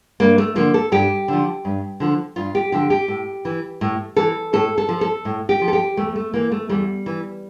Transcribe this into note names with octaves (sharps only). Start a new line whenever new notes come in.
G2 A#3
A3
D3 F3 A#3
A4
G2 G4
D3 F3
G2
D3 F3
G2 F4
G4
D3 F3 G4
G4
A2
E3
A2
E3 A4
A2 A4
A4
F3
A4
A2
G4
F3
A4
G4
E2 A3
A3
E3 A#3
A3
E2 G3
E3